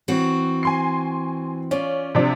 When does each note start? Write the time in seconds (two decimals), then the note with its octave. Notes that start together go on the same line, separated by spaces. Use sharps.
0.08 E3 C4 F#4
0.63 G#5 C6 C7
1.71 C#4 F4 D5
2.15 C3 F3 D4